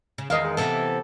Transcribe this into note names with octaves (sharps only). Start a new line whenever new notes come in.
C#3
E2 D#3 D#5 F5
G#3
C3 E3 B3 A4